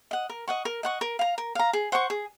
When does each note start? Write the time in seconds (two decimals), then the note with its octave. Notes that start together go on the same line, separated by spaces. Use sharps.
0.11 D#5 F#5
0.29 A#4
0.48 D#5 F#5 C#6
0.65 A#4
0.83 D#5 F#5 C#6
1.01 A#4
1.19 F5 A#5
1.38 A#4
1.55 F5 A#5
1.73 G#4
1.92 C5 F#5 C#6
2.10 G#4